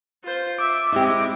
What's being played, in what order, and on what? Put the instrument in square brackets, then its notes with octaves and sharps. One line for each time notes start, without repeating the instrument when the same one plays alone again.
[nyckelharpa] F4 C5
[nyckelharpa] E5 [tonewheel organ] D6
[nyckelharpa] G#3 C4 [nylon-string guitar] E4 G4 [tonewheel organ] D6